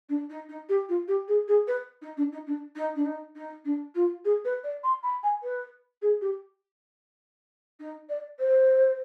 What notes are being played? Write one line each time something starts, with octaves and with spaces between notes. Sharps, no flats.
D4
D#4
D#4
G4
F4
G4
G#4
G#4
B4
D#4
D4
D#4
D4
D#4
D4
D#4
D#4
D4
F4
G#4
B4
D5
C6
B5
G#5
B4
G#4
G4
D#4
D5
C5